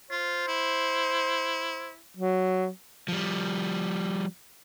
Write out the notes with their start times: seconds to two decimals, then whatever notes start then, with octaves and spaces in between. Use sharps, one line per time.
0.11 F4 C5
0.48 E4
2.16 F#3
3.08 F3 G3